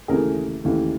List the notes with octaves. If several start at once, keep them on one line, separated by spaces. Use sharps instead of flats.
D#2 C#3 E3 A3 G#4 A#4
D#2 C#3 E3 A3